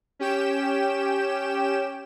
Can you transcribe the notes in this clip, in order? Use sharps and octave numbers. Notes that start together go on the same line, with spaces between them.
C#4 G4 G5 E7